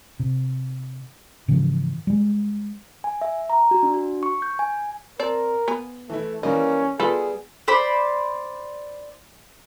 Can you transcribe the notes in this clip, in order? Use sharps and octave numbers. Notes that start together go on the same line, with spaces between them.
C3
G#2 C#3 E3 F3
G3 G#3
G#5
E5
A#5
F#4
D4
F#4
C#6
G6
G#5
C4 A#4 D5 A5
B3 G#5
E3 A3 E4
E3 G3 A#3 C#4 D#5
G3 B3 F4 G#4 A4 B4
C5 D5 B5